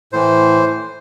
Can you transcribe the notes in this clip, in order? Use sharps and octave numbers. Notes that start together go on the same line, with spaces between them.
A2 E3 C5